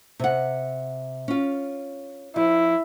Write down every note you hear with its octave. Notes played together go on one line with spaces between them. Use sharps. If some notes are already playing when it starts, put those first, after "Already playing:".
C3 F#5
C#4 F4
F3 E4